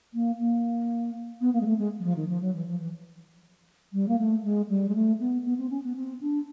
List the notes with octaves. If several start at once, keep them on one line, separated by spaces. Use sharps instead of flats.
A#3
A#3
B3
A#3
G#3
A3
G#3
F#3
F3
D#3
F3
F#3
E3
F3
E3
G3
A#3
A3
G#3
G3
G#3
A3
B3
B3
C4
C#4
B3
C4
D4